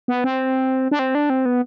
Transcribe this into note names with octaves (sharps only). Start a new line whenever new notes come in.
B3
C4
D4
C4
D4
C4
B3